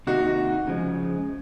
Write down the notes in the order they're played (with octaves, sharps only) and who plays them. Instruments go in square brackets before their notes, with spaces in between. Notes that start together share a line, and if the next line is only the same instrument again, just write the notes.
[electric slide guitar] C3 D#3 A#3 D#4 [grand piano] F#4
[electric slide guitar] C#3 F3 G#3